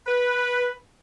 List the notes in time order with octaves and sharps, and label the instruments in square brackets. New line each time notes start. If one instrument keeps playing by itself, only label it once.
[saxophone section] B4